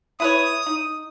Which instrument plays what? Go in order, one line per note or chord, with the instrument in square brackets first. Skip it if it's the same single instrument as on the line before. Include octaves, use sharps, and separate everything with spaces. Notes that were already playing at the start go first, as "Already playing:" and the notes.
[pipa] E4 B4 C#5 [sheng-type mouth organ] D#6
[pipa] D#4